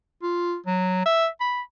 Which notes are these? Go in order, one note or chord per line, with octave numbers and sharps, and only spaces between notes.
F4
F#3
E5
B5